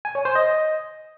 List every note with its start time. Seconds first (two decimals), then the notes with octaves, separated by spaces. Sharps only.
0.05 G#5
0.15 C#5
0.25 C5
0.35 D#5